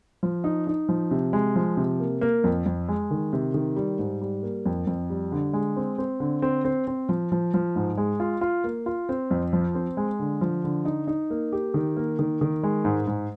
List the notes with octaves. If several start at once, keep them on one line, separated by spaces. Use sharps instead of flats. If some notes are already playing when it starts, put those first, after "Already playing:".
F3
D#4
D#4
F3
C3
G#3
F3
C3
A#3
A#3
F2
F2
G#3
D#3
C3
D#3
G3
G#2
G3
A#3
F2
F2
G3
D3
G#3
C4
C4
D3
C4
C4
C4
F3
F3
F3
G#2
G#3
F4
F4
A#3
F4
C4
F2
F3
C4
G#3
D3
F3
D3
D#4
D#4
A#3
G4
D#3
A#3
D#3
D#3
G#3
G#2
G#2